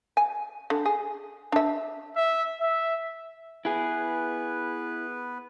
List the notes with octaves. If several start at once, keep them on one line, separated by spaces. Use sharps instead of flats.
G#5
D3
G#4
D4 E5
E5
E5
B3 E4 G#4 B4